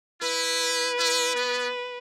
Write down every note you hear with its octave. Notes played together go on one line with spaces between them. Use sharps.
E4 B4
E4
B3